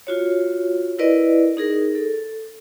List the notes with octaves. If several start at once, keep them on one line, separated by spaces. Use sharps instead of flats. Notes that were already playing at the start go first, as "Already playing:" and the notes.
F4 F#4 C#5
E4 A#4 B4 D5 D#5
D#4 G#4 A#4
A4